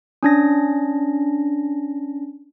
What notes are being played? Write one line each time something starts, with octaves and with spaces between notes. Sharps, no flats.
C#4 D4 A#6